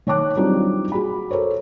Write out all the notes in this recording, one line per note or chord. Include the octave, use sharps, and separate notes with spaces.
D#3 C#5 A5 D6 F#6
F#3 G3 C4 D4 D#4 F4
F#4 G#4 B5
A4 A#4 C5 C#5